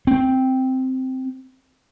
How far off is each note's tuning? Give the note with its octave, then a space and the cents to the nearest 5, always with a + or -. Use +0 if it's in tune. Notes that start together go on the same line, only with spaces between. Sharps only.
C4 -5